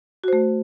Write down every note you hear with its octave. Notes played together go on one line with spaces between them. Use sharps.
A3 F#4 C5